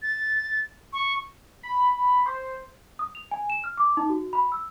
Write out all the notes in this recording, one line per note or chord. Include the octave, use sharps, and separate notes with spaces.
A6
C#6
B5
C5
D#6
F7
G#5
E7
F6
D6
D#4
F#4
B5
E6